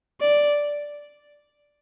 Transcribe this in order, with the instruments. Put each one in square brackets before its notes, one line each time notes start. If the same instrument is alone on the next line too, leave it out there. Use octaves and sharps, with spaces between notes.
[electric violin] D5